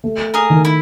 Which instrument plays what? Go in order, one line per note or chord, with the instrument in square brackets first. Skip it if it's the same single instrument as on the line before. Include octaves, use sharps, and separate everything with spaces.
[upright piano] A3
[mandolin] G#4 A#4
[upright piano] D#3
[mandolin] E4